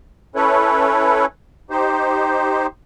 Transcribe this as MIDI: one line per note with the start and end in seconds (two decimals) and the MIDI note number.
0.35 1.26 61
0.35 1.26 64
0.35 1.26 69
0.35 1.26 71
0.35 1.26 73
1.70 2.67 63
1.70 2.67 67
1.70 2.67 72